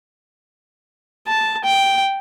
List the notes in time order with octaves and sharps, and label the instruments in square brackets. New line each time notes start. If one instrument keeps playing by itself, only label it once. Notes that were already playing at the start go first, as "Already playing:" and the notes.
[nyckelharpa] A5
G5